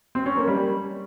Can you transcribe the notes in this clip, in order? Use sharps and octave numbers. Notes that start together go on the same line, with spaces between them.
C4
C#4
A#3
G3